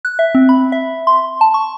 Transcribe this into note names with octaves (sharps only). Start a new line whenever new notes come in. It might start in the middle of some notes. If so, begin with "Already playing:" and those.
F#6
E5
C4
B5
E5
C6
A5
C#6